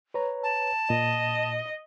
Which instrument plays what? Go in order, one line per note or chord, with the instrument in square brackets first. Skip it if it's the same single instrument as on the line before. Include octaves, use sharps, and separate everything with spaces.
[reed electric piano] B4 C#5 A#5
[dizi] A5
[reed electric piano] A#2 [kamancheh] D#5